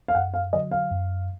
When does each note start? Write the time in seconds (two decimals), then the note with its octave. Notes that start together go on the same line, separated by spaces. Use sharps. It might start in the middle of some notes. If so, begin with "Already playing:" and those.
0.08 F5
0.15 F#2 F#5
0.34 F5
0.53 D3 F#3 D#5
0.71 F5
0.91 F#2